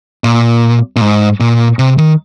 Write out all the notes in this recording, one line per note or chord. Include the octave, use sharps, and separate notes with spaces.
A#2
A#2
G#2
A#2
C3
D#3